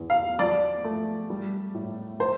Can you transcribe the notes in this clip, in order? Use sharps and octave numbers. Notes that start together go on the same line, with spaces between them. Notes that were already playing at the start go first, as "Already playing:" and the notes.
Already playing: E2
F5
F3 D5
A3
G3
A2
F3 C5